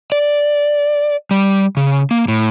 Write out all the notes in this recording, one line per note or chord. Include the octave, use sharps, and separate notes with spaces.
D5
G3
C#3
A#3
A2